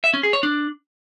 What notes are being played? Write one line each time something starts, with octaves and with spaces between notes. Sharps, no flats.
E5
C#4
G#4
C#5
D4